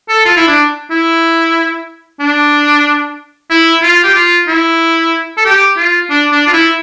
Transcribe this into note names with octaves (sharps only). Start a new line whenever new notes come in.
A4
F4
E4
D4
E4
D4
E4
F4
G4
F4
E4
A4
G4
F4
D4
D4
F4
E4